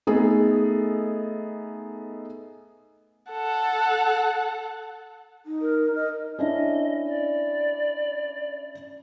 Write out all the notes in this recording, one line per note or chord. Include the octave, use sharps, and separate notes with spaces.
A3 B3 D#4 G#4 A4
A4 F#5
D#4
A#4
D#5
C#4 D4 E4 D#5
D5